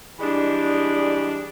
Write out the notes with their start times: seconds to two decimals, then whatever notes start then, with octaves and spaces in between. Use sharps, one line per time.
0.19 E3 G3 G#3 D4 G4